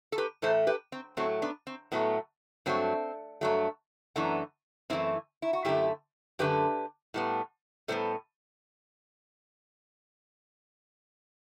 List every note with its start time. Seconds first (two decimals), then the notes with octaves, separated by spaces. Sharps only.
0.12 A4
0.18 G4 B4
0.42 A2 E3 A3 A4 C5
0.67 G4 B4
0.92 C4
1.17 A2 F#3 A3 C4
1.42 B3 D4
1.67 C4
1.92 A2 F#3 A3 B3
2.66 G2 F#3 A3 C4
3.41 G2 F#3 A3
4.16 F#2 E3 A3 B3 D4
4.90 F#2 E3 A3 C4 E4
5.42 E4
5.53 F#4
5.65 F#2 D3 A3 E4 G4
6.39 F#2 D3 A3 G4 B4
7.14 A2 G3 B3
7.88 A2 G3 B3 A4 C5